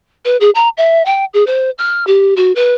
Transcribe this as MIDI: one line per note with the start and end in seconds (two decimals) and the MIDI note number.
0.25 0.37 71
0.40 0.50 68
0.55 0.68 82
0.77 1.05 76
1.05 1.25 79
1.34 1.44 68
1.47 1.70 72
1.78 2.06 89
2.07 2.34 67
2.36 2.54 66
2.55 2.75 71